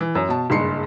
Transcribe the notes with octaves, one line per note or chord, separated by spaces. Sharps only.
E3
F#2
B2 A5
F#1 G2 G#3 C6 C7 C#7